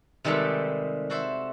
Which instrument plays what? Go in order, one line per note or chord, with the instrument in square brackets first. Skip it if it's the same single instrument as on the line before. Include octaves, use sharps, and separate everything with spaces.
[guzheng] C3 D#3 G3 G#3 A4 B4
F#4 A4 C5 E5